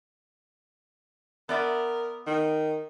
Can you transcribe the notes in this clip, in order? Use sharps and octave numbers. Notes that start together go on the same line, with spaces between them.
B3 A#4 D5 E5
D#3